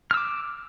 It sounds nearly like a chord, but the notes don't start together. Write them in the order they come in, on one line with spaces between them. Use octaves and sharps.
F6 E6 D6